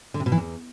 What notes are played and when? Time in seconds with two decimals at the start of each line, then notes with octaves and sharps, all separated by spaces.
0.14 D3
0.20 C3
0.26 B2
0.32 E3
0.38 E2